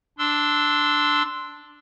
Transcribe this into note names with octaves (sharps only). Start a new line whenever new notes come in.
D4 C6 E6